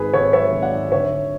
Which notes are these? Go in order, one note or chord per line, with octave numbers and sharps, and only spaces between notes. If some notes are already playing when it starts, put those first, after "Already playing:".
Already playing: G#1 G#2 G#4 B4
G#1 A4 C#5
F#3 C#5 E5
G#1
D5 F#5
G#2
D2 C#5 E5
D3